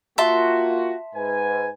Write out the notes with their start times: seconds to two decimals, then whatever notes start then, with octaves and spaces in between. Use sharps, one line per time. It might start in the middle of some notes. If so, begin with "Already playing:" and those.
0.18 A#3 F4 F#4 E5 A5 C6
1.15 G#2 B4 G#5